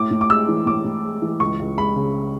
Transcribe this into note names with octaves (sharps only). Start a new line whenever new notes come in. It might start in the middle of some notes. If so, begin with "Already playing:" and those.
Already playing: A2 D6
A2
D6
G#3 E6
E3
A2 D6
A2
G#3
E3
C#2 C#6
C#2
G#3 B5
C#3